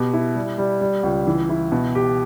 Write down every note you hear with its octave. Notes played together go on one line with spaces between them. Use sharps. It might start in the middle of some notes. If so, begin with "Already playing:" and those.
Already playing: B2 G4
E4
G3
G3
G3
C#2
E3
E4
B2
G4